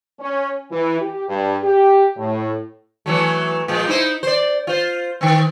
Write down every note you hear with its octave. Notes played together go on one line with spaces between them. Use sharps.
C#4
E3
G4
G2
G4
A2
E3 F#3 A3
A#2 F3 G#3
D#4 E4 C5
C5 D5
F4 C5
D#3 C4